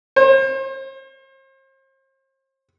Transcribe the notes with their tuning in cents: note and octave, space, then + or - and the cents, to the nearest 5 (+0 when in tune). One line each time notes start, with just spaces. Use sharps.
C5 +40